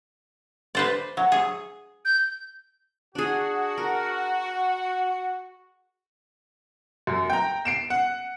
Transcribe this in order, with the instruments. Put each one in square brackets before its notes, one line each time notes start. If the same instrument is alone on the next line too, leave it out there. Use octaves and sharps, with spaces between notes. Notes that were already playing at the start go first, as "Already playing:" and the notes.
[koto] B4 C5 D5
F#3
G#4
[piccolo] G6
[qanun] D4 G#4 [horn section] F#4
[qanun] A#4
[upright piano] F#2
G5 A#5
C7 D7 E7
F#5